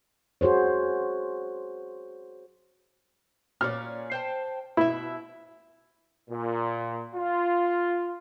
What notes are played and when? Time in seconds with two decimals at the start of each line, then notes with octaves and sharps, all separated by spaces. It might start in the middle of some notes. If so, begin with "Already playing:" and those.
0.41 F#4 G#4 C5 C#5
3.61 A#2 C#4 D5 F6
4.12 C5 G5 A5
4.77 B2 E4 E5
6.30 A#2
7.16 F4